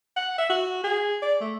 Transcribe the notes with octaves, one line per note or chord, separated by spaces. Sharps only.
F#5
E5
F#4
G#4
D5
A3